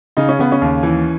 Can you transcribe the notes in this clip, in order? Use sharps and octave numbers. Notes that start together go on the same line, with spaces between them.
C#3 D#4
C#4
C#3 B3
C#4
D#2
E3